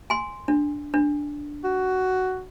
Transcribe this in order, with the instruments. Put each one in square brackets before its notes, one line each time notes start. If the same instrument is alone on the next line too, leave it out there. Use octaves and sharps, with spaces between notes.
[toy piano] G#5 C6
D4
D4
[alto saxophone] F#4